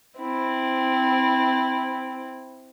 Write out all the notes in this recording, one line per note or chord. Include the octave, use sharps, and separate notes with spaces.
C4 E4